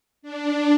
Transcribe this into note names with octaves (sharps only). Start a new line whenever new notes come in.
D4